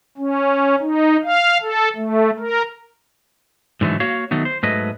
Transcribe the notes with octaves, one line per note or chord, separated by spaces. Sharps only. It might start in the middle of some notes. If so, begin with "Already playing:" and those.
C#4
D#4
F5
A4
A3
A#4
G#2 D3 E3 F#3 A3
A#3 F#4 C#5 F5
D#3 F#3 A3 B3
C5
G#2 F#3 A3 B4 D#5